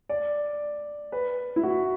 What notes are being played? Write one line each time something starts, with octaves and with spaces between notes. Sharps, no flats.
D5
B4
E4
F#4